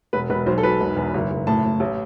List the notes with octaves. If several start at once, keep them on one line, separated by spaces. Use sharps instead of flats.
E1 B4
E1 B4
B1 C5
A4
B1 B4
E1
E2
F#1
F#1
A2 A5
A2
A1